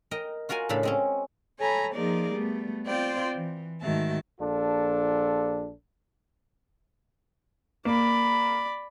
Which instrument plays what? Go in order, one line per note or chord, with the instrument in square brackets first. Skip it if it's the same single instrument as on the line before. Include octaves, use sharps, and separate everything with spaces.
[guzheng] A#4 D#5 G5
F4 F#4 A#4 F#5 G#5
A2 C#3 D4 A4 F5 B5
G#3 C4 C#4
[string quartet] A4 C#5 G#5 A#5 B5
F3 A#3 D#4 G#4 A#4 D5
G3 A3 B3
C4 F4 C5 D5 G5
E3
G#2 D#3 A3 F#4 E5 A5
[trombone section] A#1 D4 F4 A4
[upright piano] A#3 [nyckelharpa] D5 B5